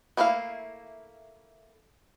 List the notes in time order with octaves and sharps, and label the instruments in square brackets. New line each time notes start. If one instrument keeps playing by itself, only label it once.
[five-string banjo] A3 A#3 E4 G#4 F5